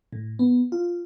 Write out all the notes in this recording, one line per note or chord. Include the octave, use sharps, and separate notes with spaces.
A2
B3
F4